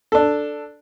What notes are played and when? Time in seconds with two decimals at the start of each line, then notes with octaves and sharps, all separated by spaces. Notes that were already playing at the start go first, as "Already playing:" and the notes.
0.12 D4 A4